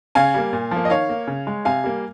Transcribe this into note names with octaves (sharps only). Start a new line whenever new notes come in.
C#3 F5 G#5
G3 A#3
A#2
F3
A#3
D#5
D#3 C#5 F5
A#3
C#3
G#3
C3 F5 G#5
G3 A#3